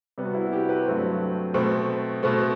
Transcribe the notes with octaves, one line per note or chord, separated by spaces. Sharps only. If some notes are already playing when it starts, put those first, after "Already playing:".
C3 G3 B3
F#4
E4
F#4
E4 G4
G4 B4
G2 F#3 A3 C4
B2 A3 C4
B2 A3 C4